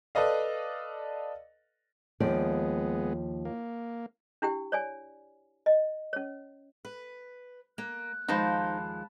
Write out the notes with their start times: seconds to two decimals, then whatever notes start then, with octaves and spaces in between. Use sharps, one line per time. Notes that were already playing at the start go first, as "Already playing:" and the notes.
0.15 A4 B4 D5 D#5 F5
2.20 D#2 F3 G#3 B3 D5
3.45 A#3
4.42 D4 E4 G4 G5
4.72 C#5 D5 G#5
5.66 D#5
6.13 C#4 C#5
6.85 B4
7.78 A#3 F#6
8.28 D#2 F3 G#3 D#4 C5 A5 B5